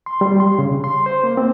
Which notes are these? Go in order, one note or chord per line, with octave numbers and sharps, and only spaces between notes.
C6
G3
C6
C#3
C6
C5
A#3
C4